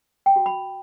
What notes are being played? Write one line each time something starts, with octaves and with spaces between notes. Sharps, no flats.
G5
F#4
B5